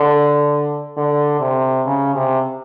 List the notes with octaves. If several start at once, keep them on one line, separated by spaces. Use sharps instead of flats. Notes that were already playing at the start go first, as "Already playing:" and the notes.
Already playing: D3
D3
C3
C#3
C3